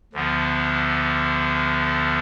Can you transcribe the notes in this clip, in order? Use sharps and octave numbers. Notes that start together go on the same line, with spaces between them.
D2 D3 F3 B3